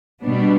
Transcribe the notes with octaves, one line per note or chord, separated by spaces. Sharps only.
B2 G3 B3 D4